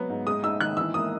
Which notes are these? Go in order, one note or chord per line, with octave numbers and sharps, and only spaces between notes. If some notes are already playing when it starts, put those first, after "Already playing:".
Already playing: F#3 B3
G#2
G#3 D#6
D#4 E6
D#3 F#6
E3 E6
A#3 D#6